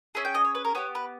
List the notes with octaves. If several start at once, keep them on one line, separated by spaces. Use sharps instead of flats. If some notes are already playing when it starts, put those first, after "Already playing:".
C#4 G#4 E5
G5
D#5
C#5
B4
A#4
B3 G4 C#5
B4